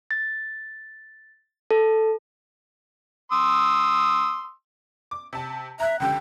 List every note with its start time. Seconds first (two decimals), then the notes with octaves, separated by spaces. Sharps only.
0.11 A6
1.71 A4
3.32 C6 D#6 E6
5.11 D6
5.33 C3 A5
5.80 E5 A#5 F#6
6.00 C#2 D3 G4 G5